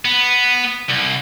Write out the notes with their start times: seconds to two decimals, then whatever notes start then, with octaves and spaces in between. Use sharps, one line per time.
0.05 B3
0.89 C2